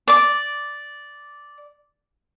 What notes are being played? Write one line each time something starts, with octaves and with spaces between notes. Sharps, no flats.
D5 D6